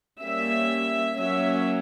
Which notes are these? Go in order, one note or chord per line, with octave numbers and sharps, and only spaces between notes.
G3 A#3 C#4 E5
F#3 A#3 C#4 E5